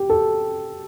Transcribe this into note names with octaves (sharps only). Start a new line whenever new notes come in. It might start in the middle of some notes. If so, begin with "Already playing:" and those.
Already playing: G4
A4